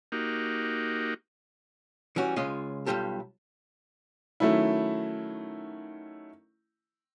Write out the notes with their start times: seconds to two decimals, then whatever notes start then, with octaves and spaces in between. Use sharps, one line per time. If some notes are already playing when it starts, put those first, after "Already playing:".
0.12 A#3 D#4 F#4 G4
2.16 E3 G3 C#4 F#4
2.36 C#2 G#3 C#4 F4 D#5
2.86 B1 A#2 G3 F4 G4 A4
4.40 D#3 F#3 A3 C#4 E4